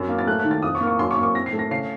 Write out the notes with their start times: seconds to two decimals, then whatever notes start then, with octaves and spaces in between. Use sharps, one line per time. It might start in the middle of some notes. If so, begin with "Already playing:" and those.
Already playing: F#2 C4 A6
0.08 A#3
0.19 A6
0.27 A3 F#6
0.40 D#3 F#6
0.51 A6
0.63 F2 D#6
0.75 C#6
0.81 A#3
0.87 C#6
0.99 F#2 C6
1.11 C#6
1.17 A#3
1.23 C#6
1.34 C4 A#6
1.46 C7
1.53 A3
1.59 A#6
1.71 C#3 C7